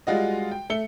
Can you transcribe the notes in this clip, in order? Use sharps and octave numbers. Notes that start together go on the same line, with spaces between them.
G3 G#3 F4 F#4 D#5
G5
A3 E5 C#7 G7